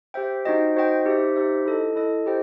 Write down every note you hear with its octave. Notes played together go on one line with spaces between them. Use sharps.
G4 C5 E5 G5
D#4 F#4 C5 D#5 G5
D#4 F#4 C5 D#5 G5
D#4 G4 C5 E5
D#4 G4 C5 E5
E4 A4 D#5
E4 A4 D#5
E4 G4 C5 D#5 G5